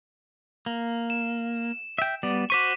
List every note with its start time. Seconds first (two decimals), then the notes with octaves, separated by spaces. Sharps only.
0.66 A#3
1.10 E7
1.98 E5 G5
2.23 G3 B3 D5
2.50 F#4 C5 C#6 D6 B6 D#7